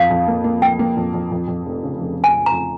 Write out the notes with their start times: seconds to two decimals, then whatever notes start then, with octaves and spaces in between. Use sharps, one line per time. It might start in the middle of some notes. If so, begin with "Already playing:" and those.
Already playing: F2 F5
0.10 F2
0.28 A#3
0.44 A#3
0.62 A#3 G5
0.79 A#3
0.97 F2
1.14 F2
1.31 F2
1.48 F2
1.66 F1
1.83 C#3
2.00 F1
2.18 F1
2.24 G#5
2.35 F1
2.46 A#5
2.52 F2